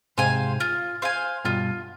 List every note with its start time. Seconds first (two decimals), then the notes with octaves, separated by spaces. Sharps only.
0.18 G#2 C3 C5 F5 G#5
0.60 F4
1.02 C5 F5 G#5
1.45 G2 B2 F4